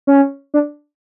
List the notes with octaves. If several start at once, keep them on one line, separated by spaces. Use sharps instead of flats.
C#4
D4